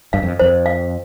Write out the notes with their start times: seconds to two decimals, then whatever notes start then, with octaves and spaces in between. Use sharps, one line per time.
0.13 G2 F5
0.23 F2
0.39 F2 C5
0.66 F5